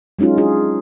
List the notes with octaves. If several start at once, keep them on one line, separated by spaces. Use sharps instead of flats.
F#3 G#3 C#4 D#4 F4
D4 F4 G#4